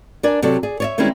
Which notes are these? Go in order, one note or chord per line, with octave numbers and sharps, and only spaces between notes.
D4 A#4 D5 G#5
C3 F#3 A4 D5
G#4 D5
C#5 D5 E5
D#3 G3 G#3 C4 C#4 E4